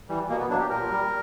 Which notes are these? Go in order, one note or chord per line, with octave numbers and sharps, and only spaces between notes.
E3 G3
B2 A#3
B3
F#3 D4
G4
A#2 A#4
G3